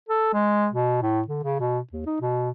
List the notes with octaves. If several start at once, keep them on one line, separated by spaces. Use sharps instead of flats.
A4
G#3
B2
A2
D3
C#3
B2
D#2
D#4
B2